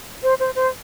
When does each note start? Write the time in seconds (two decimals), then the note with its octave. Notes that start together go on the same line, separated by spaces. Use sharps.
0.23 C5
0.39 C5
0.55 C5